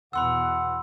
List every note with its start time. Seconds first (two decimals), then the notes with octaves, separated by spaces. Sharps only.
0.13 E2 B2 F#5 B5 C6 E6